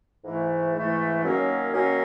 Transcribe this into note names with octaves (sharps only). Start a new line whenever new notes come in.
G#2 E3 A3
G#2 E3 A3
F#2 D#3 F#3 A#3 C#4
F#2 D#3 F#3 A#3 C#4